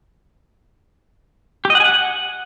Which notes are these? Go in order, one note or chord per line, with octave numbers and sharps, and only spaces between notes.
G4
D#5
F#5
G#5
F#5